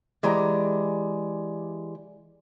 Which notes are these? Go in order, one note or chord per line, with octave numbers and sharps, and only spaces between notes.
E3 G#3 G4 D5 A#5